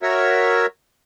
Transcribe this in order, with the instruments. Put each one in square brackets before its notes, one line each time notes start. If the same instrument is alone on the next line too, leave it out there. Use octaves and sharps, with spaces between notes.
[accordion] F#4 A#4 C#5 E5